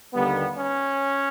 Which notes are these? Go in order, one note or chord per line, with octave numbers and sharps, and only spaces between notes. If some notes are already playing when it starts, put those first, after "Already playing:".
D#2 D3 G3 B3
C#4